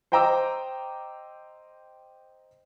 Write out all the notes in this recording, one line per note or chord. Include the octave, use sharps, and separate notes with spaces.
C5 D#5 G5 A#5 D6 E6